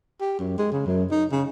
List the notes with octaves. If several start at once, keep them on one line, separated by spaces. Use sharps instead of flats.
G4
F#2
G#3
C#3
F#2
D#4
C#3